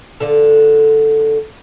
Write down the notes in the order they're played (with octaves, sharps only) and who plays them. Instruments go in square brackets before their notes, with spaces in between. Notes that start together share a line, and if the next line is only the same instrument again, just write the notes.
[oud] D3 F4 A4